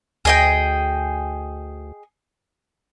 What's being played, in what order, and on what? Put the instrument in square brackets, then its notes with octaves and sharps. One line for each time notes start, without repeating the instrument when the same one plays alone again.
[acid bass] D2 [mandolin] G#4 D#5 G5